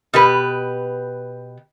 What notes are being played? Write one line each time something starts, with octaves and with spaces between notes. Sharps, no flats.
B2 G4 B4